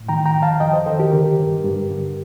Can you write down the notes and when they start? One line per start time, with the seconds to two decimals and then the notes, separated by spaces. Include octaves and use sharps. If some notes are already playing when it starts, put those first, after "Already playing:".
Already playing: A2
0.09 D#3 G5 A#5
0.25 G5 A#5
0.35 F2
0.42 F5 A5
0.60 F2 D#5 G5
0.73 C5 D#5
0.86 D#3 A4 C5
0.99 G4 A#4
1.13 D3
1.39 G2
1.64 G2
1.90 D3